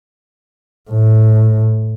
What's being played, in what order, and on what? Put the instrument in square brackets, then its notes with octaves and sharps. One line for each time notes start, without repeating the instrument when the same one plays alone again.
[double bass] A2